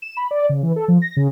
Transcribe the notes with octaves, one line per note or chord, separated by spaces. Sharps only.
E7
B5
D5
C#3
E3
A4
F3
A#6
C#3